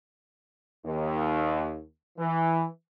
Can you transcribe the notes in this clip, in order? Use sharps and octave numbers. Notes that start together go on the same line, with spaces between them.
D#2
E3